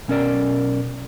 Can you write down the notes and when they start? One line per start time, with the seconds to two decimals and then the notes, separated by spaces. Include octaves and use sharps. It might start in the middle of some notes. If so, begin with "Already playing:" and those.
0.08 B1 C#4 A#4 D5